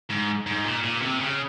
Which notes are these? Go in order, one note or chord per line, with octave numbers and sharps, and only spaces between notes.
G#2
G#2
A#2
A#2
C3
C#3